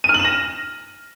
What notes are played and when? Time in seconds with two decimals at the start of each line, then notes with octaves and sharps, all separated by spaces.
0.04 D#7
0.09 F6
0.14 F#7
0.19 E7
0.25 A#6